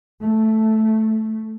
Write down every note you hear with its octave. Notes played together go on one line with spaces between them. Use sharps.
A3